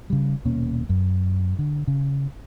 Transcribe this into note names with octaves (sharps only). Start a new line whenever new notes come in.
C#3 G3
D#1 B2 A#3 C#4
F#2
D3
C#3